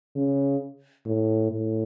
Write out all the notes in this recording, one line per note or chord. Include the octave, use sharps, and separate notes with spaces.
C#3
A2
A2